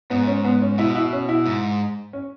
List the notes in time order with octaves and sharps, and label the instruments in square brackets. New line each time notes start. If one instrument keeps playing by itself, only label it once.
[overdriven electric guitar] G#2 [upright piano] B3
[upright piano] C#4
B3
C#4
[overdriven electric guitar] B2 [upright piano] E4
[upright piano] E4
C#4
E4
[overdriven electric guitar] G#2
[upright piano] C#4